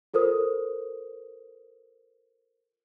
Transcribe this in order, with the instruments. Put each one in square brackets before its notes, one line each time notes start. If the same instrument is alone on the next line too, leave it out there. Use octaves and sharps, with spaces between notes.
[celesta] F4 A4 A#4 C5 D#6